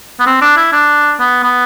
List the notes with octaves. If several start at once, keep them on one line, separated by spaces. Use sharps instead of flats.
B3
C4
D4
E4
D4
B3
B3